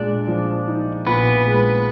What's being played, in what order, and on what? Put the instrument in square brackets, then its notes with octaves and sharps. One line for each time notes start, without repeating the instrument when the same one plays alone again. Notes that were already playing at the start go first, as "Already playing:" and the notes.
Already playing: [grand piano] A#2 G#3 [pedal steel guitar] D4 D5
[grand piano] F3
D#4
[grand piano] A#2 [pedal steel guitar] B3 B4
[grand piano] G#3